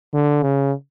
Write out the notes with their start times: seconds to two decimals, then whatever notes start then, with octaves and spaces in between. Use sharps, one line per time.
0.13 D3
0.42 C#3